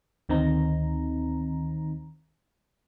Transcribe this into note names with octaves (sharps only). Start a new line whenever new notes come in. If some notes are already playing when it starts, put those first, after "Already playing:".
D2 D#3 C4 D#4 A#5